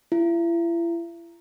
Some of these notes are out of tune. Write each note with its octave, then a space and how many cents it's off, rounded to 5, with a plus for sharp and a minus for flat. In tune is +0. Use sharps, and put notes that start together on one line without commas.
E4 +40